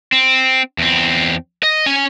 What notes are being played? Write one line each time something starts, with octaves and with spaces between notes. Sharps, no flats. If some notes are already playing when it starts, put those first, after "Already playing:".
C4
E2 C4
D#5
C#4 G#5